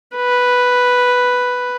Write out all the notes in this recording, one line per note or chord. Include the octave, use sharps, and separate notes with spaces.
B4